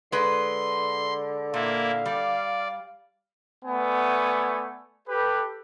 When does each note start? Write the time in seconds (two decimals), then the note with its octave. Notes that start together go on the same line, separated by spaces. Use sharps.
0.12 D3 G#3 B4 C6
1.54 A#2 A#3 E4 F5
2.06 G3 D5
3.65 A3 B3 D5 G#5
5.08 G4 A4 B4